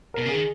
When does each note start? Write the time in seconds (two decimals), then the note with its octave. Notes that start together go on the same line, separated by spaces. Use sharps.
0.14 B2 A#4
0.26 C#3 G#4
0.35 D#3